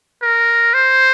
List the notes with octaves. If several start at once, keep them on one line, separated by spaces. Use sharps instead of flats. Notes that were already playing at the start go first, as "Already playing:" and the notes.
A#4
C5